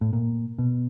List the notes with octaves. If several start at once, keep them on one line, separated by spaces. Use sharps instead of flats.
A2
A#2
B2